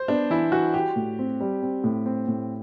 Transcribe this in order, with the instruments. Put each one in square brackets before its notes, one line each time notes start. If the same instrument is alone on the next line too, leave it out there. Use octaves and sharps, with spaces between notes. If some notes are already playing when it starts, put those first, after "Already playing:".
Already playing: [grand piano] C5
[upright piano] B3 [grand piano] D4
[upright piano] E3 [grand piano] E4
[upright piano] E3 [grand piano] F#4
[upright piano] F#4 [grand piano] G4
[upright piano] A2
C4
G3
C4
A2
C4
A2